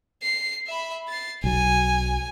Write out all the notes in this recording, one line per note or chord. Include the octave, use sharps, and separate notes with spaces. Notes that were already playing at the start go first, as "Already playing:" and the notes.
C7
E5 B5
A6 C7
B1 F#3 G#5